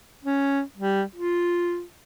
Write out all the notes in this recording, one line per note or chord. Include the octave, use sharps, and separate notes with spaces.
C#4
G3
F4